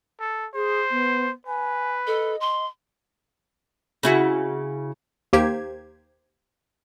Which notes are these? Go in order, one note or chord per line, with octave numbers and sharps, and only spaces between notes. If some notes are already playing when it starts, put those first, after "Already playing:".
A4
G#4 C5
B3
B4 G#5
A4 D#5
C6
C#3 E4 F#4
D#2 A#3 G4 C5 G#6